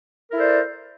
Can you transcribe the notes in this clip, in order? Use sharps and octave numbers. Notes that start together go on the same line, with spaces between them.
E4 A4 A#4 C5 D5